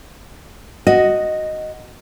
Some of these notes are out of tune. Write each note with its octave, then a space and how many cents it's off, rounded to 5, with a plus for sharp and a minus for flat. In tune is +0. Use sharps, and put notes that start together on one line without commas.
F#4 +0 D#5 +0